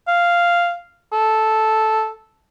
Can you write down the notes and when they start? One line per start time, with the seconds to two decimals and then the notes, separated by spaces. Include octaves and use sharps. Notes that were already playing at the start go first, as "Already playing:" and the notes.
0.08 F5
1.13 A4